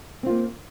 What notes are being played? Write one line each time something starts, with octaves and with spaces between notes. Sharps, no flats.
A#3 C4 F4